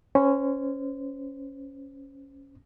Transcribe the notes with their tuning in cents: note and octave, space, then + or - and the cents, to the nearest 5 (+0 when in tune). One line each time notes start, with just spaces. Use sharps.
C#4 +0 C5 -25